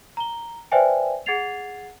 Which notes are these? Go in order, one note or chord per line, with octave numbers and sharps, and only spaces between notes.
A#5 G7
B4 C5 D5 E5 G5 G#5
G#4 F#5 G#6 A6 C7 F7